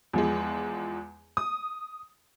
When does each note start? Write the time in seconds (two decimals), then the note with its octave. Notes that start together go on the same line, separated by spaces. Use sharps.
0.13 E2 F3 G#3
1.37 D#6